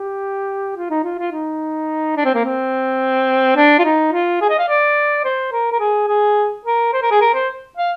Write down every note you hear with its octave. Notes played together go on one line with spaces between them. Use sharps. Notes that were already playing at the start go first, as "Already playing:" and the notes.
Already playing: G4
F4
D#4
F4
F4
D#4
D4
C4
A#3
C4
D4
F4
D#4
F4
G#4
D#5
F5
D5
C5
A#4
A#4
G#4
G#4
A#4
C5
A#4
G#4
A#4
C5
F5